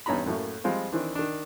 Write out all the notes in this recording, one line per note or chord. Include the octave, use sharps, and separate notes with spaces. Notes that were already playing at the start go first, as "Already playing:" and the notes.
E2 G2 C#4 D#4 A#5 B5
F#2 A2 F#3 A3 A#3
F3 G3 G#3 C4 F4
D#3 E3 C4 D4
D#3 D4